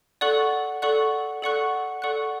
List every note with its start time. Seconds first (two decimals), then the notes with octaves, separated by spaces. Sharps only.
0.21 A4 D5 F#5 C#6 F#6
0.82 A4 D5 F#5 C#6 F#6
1.42 A4 D5 F#5 C#6 F#6
2.02 A4 D5 F#5 C#6 F#6